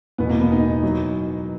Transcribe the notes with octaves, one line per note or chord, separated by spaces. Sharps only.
E1 E2 B2 B3
A#3
B3
D#4
F#3